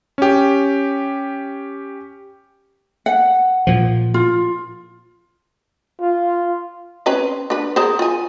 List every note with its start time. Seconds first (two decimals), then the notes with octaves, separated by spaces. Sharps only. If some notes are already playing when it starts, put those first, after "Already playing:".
0.18 C#4 G4
3.06 F#5
3.67 A#2 F3
4.14 F4
6.01 F4
7.06 C4 C#4 B4
7.50 D4 B4
7.76 G#4 A#4 C5
7.99 F4 G#5